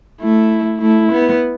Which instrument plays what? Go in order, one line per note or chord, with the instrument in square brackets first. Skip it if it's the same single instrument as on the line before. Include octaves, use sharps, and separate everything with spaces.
[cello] A3 [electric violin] E4
[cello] A3 [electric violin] E4
[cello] B3